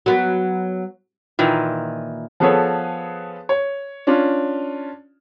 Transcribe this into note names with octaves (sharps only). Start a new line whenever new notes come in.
F#3 B3
A#2 D#3 E3
F3 B3 G#4 A4 B4 C#5
C#5
C#4 D4 F4